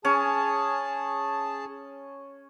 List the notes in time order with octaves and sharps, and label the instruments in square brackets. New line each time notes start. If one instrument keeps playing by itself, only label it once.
[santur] C#4 [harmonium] G#4 A5